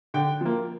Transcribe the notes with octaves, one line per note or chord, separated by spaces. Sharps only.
D3 G5
F3 A#3